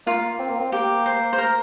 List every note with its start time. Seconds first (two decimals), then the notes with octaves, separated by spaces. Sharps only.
0.06 A#3 F4
0.39 C4
0.49 A#3
0.60 C4
0.72 A#3 G4
1.06 C5
1.33 C5
1.38 A#4